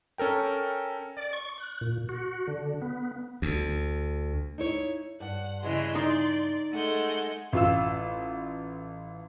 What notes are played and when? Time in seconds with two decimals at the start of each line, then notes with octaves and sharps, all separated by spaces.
0.18 C#4 A4 A#4 G5
1.17 D5
1.33 C#6
1.58 F#6
1.81 A#2
2.09 F#4
2.47 D3
2.82 B3
3.42 D2
4.58 D#4 E4 C#5
5.20 G2 F#5
5.62 C#3 E3 G#3 C6
5.95 D#4 D5
6.72 G#3 A3 A4 F#5 G6
7.53 A1 F4 E6